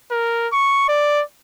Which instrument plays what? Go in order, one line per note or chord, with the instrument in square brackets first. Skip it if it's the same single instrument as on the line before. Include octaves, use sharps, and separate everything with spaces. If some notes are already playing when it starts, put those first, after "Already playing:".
[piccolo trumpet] A#4
C#6
D5